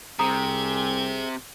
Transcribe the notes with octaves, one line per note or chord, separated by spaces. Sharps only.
C2 C3 C4 G#4 G5 G#5 A#5 D#6